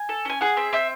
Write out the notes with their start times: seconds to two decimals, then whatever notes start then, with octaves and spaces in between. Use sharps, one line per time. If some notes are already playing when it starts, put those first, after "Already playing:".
Already playing: G#5
0.09 A4
0.25 C#4 G#5
0.41 G#4 F#5
0.57 C4 E5
0.73 C4 E5